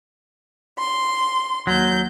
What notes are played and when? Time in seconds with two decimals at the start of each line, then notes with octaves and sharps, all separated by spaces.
0.78 C6
1.67 D#2 F#3 G6